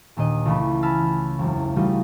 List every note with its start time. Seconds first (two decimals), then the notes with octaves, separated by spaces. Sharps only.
0.17 D#2 A#2 D4 D#5
0.45 C#2 E3 A3 B5
0.82 G#5 A5 B5 E6 F6
1.39 E1 F#2
1.76 E3 G3 A3 D#4 F4 F#4